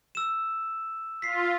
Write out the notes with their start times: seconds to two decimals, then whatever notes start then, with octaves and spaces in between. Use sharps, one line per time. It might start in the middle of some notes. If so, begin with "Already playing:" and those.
0.15 E6 E7
1.22 F4 B6 C7